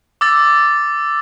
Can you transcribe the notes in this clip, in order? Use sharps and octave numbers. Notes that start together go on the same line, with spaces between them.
D6 E6 A6